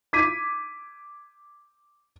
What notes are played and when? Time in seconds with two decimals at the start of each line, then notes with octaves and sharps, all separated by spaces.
0.13 D6 G#6 B6 D#7